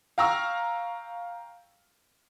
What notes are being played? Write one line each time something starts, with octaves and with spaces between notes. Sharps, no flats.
F5 G5 A#5 C#6 E6 F6